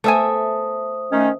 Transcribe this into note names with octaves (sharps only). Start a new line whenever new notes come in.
A3 B3 C5 E5 G#5 D#6
D#3 A3 C#4